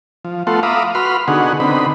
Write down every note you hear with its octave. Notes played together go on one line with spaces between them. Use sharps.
F3
A3 B3 F4 A4 F#5 C6
E5 F5 A#5 B5 D6 D#6
F#4 B4 B5 C6 F6
D3 B3 D#4 F#4 G#4 F#5
D3 B3 C4 D#4 B5